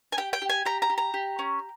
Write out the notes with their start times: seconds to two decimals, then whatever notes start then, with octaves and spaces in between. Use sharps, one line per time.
0.12 G#5
0.17 G4 G5
0.33 G5
0.42 G4
0.50 G#5
0.65 G4 A#5
0.82 A#5
0.90 G4
0.98 A#5
1.14 G4
1.39 C#4